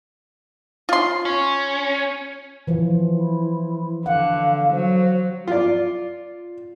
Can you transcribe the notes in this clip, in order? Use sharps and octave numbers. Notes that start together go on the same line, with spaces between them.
F4 C6
C#4
E3 F3
E4
D3 F5 F#5
F#3 C5
F4 D5